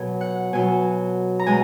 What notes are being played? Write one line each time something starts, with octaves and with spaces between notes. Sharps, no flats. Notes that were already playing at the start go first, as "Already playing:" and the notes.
Already playing: B2 F#3 G#5
F#5
B2 F#3 G#5
A#5
B2 G#3 G#5